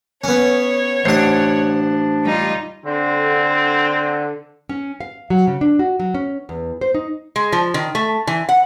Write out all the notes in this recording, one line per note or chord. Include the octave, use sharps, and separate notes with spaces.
B3 C#4 C#5
A1 D4 C5 F#5
G3 D#4 F4
D3 C4
C#4
F5
F#3
C#3
D4
F#4
F#3
C#4
E2
C5
D#4
G#3
F3
D#3
A3
E3
F#5